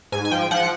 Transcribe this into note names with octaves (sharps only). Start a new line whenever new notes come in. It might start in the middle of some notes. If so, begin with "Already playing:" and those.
G#2 G#5
G#5
F3 G5
F3 F#5